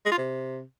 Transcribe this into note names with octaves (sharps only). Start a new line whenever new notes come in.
G#3
F4
C3